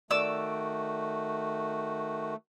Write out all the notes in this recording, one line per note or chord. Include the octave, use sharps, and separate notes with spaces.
D#3 A3 F#4 D5 E6